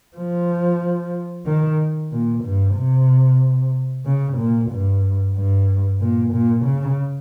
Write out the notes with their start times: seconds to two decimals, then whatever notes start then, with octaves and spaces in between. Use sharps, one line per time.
0.16 F3
1.46 D#3
2.11 A#2
2.44 G2
2.75 C3
4.06 C#3
4.38 A#2
4.71 G2
5.35 G2
6.00 A#2
6.33 A#2
6.66 C#3